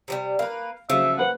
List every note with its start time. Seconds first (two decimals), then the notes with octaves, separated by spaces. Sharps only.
0.08 C3 F3 G3
0.39 A#3 B4 F5
0.90 C#3 F3 F#3 A3 E5
1.18 A#3 B4 C5 F#5